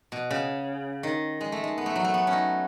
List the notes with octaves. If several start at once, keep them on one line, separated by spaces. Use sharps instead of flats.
B2
C#3
D#3
G#3
A3
G#3
B3
A3
F#3
A3
B3
C#4
D#4